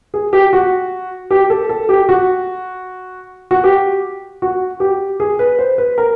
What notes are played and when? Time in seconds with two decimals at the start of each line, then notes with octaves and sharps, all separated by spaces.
0.14 G#4
0.33 G4
0.53 F#4
1.31 G4
1.50 A4
1.69 A4
1.89 G4
2.09 F#4
3.51 F#4
3.64 G4
4.42 F#4
4.80 G4
5.20 G#4
5.39 B4
5.59 C5
5.78 B4
5.98 A#4